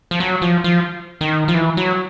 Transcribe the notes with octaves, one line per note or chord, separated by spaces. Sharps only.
F3
F#3
F3
F3
D#3
F3
E3
F#3